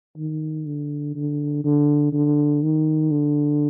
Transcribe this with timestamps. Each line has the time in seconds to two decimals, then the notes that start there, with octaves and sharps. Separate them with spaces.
0.17 D#3
0.66 D3
1.15 D3
1.64 D3
2.13 D3
2.63 D#3
3.11 D3